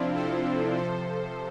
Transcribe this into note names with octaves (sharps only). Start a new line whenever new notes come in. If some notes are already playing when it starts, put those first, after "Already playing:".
Already playing: C3 F3 C4 D4 E4 F4
A4 C5
C3 F3 A4 C5